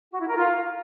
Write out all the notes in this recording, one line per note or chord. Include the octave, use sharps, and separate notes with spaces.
F#4
E4
A#4
F4